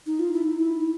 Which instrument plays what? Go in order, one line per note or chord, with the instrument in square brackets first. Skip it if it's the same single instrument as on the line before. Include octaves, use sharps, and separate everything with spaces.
[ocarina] D#4
F4
E4
D#4
E4